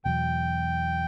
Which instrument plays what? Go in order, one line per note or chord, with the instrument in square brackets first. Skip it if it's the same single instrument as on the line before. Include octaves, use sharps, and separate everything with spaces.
[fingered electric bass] E2 B2 F#3 [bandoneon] G5